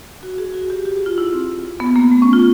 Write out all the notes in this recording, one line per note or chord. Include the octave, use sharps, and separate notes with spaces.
F#4
G#4
F#4
G4
G4
G#4
F4
E4
C4
B3
A#3
A3
C#4
F4